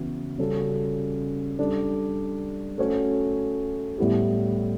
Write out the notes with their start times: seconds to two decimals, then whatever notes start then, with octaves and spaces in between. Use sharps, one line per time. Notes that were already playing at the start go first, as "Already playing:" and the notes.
Already playing: C#3 E3 B3 F#4
0.38 C#3 G3 C#4 F#4 A4
1.58 G3 D4 A4 D5
2.78 A3 C#4 F#4 C#5
3.98 A2 G3 B3 E4 G4